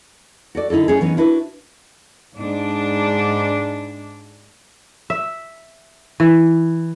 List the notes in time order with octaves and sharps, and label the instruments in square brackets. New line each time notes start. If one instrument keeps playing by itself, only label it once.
[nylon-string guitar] F#4 A4 D5
D3 D#4 E4 F#4 A4
A3 C#4 G#4
E3 B3 C#4 D#4
D4 E4 F#4 B4
[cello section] G#2 D4
[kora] E5
E3